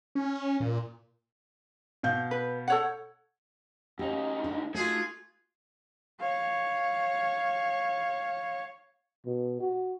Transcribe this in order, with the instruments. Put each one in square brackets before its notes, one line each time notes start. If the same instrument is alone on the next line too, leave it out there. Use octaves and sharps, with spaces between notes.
[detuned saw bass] C#4
A#2
[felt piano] B2 F5 G6
[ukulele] B4
A4 C#5 F#5
[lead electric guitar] D2 D#4 [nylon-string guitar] C#4 G4
[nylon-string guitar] D4 A4
[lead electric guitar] A3 [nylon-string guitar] D#4 [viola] F4 F#4 [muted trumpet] G#4
[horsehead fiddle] C#5 F5
[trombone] B2
F#4